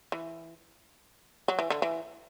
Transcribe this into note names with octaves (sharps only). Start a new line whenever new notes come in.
E3
F#3
E3
D3
E3